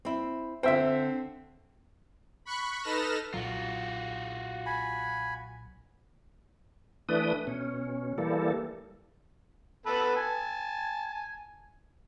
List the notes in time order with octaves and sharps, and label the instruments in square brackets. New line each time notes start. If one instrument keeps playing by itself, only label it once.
[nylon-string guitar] C4 E4
[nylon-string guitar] D3 G5 [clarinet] C4 [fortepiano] C5 E5
[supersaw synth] B5 C#6 F#6
D#4 A4 B4 F6 A#6 E7
[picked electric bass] B1 A#2 F#3 [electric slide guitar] F4 F#4
[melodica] G#5 B5
[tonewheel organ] E3 A3 D4 B4 D#6
B2 C#4
E3 G3 A#3 A4
[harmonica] B3 A4 B4
G#5 A5